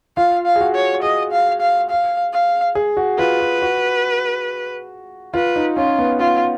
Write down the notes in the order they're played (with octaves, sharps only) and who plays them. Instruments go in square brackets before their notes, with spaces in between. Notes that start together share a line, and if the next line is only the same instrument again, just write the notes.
[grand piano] F4 [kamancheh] F5
[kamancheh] F5
[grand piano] G#4
F#4
[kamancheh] C#5
[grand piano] G#4 [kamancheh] D#5
[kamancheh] F5
F5
F5
F5
[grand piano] G#4
F#4
[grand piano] F4 [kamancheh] B4
[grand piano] F#4
F#4
[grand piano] F4 [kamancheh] B4
[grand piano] D#4
[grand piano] C#4 [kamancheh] F4
[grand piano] B3
[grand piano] B3 [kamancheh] F4